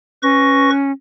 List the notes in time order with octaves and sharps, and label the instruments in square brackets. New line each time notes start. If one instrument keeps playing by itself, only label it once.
[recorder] C#4 [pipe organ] B4 C#6 A#6